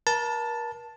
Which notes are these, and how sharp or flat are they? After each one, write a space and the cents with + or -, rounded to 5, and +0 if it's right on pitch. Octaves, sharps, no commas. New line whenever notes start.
A#4 +35 A5 +0